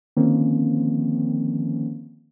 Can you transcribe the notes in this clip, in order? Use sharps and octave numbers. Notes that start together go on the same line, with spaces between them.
D3 D#3 F3 A#3 C4 C#4